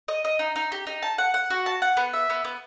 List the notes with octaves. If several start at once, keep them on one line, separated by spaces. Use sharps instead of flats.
D#5
D#5
D#4
D#4
G4
D#4
A5
F#5
F#5
F#4
A5
F#5
B3
E5
B3
B3